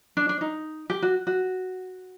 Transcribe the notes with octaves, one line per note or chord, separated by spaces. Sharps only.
D4
D4
D#4
G4
F#4
F#4